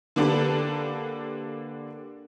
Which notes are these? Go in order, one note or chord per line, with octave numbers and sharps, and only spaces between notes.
D3 A#3 D4 G4 A4 B4